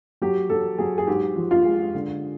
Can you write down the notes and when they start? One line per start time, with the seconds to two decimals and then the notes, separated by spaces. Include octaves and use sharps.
0.22 F#3 G4
0.50 F#3 A4
0.78 F#3 G#4
0.98 G#4
1.07 G#2 G4
1.36 F3
1.51 F4
1.65 G#3
1.94 D3